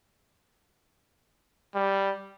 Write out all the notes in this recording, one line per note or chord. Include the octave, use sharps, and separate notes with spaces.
G3